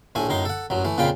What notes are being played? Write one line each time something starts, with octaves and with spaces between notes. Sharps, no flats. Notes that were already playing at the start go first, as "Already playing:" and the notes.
A#1 A2 A3 G#5
F#2 A2 D#4 C6
A4 F#5
A1 F#2 F#3
E3 A3
F2 A#2 C#3 F4 G5 B5